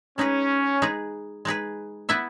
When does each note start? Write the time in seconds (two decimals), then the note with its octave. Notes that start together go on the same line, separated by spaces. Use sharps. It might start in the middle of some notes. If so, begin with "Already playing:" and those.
0.18 G#3 C#4 D#4 G#4 B4
0.82 G#3 D#4 G#4 B4
1.45 G#3 D#4 G#4 B4
2.09 B3 E4 B4 E5